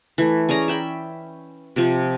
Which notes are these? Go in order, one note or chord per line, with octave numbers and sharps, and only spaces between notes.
E3 A3
C#4 G#4 D5 A#5
E5 G5 B5
C3 F3